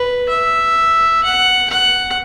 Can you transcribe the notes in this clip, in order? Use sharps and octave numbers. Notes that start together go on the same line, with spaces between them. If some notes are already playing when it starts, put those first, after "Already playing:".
Already playing: B4
E5
F#5
F#5